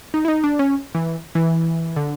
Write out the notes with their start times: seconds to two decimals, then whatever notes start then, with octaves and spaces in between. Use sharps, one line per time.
0.14 D#4
0.25 E4
0.28 D#4
0.44 D4
0.59 C#4
0.95 E3
1.35 E3
1.96 D3